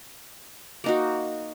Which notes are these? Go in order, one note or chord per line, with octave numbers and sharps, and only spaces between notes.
A#3 D#4 F#4